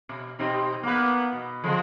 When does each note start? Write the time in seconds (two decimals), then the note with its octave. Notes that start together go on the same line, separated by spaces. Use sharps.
0.09 B2
0.39 B2 C4 D#4 G4
0.83 A#3 B3 B4
1.33 B2
1.64 D3 F3 G#3 C4